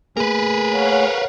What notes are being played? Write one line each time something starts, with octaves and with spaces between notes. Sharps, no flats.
A3 A#3 G#4 A#4 B4
C#5 F5 F#5